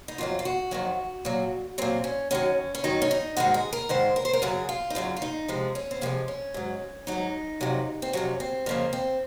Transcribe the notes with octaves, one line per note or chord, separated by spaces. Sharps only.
D#4
F2 D#3 F#3 F4
F4
F#4
F2 D#3 F#3
A#2 F#3
A#2 F#3 C4
C#4
F#2 D#3 F#3 C#4
C#4
F#2 D#3 F#3 D#4
C#4
D#4
G#2 D#3 G#3 F#4
G#4
A#4
G#2 D#3 G#3 C5
A#4
C5
A#4
F#2 C#3 F#3 G#4
F4
D#4
F#2 C#3 F#3 F4
F4
D#4
C3 F3 G#3
C#4
C4
C3 F3 G#3 A#3
C#4
G#2 F#3
G#2 F#3 D#4
F2 C3 F#3
C4
F2 C3 F#3 C#4
C4
F2 C#3 F3 A#3
C4